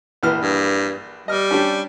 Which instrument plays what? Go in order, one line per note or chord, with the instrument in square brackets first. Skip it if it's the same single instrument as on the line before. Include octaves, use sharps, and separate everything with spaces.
[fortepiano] A#1 E3 F6
[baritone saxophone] G2
[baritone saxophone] G3 [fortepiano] D#5 F6
[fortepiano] C#4 D4 G4